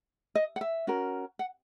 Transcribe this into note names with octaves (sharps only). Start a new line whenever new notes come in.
D#5
F#5
E5
C#4 F#4 A#4
F#5